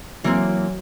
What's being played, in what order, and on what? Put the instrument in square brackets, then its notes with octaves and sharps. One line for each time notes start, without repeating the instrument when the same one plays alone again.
[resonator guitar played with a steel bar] E3 A#3 C4 [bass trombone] F#3